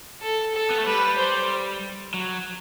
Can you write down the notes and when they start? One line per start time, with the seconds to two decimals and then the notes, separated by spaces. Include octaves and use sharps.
0.22 A4
0.55 A4
0.70 B3
0.78 A3
0.86 G3 B4
1.18 C5
2.14 F#3